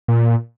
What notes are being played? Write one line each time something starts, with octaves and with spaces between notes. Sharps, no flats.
A#2